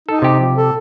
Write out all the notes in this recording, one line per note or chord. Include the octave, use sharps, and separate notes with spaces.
D#4 A4
C3 G4
F3
A4